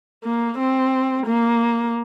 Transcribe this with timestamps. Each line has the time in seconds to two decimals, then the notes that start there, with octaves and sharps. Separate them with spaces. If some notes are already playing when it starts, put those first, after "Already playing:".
0.24 A#3
0.58 C4
1.27 A#3